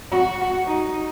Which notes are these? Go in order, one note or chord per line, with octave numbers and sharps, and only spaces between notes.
F#4
D#4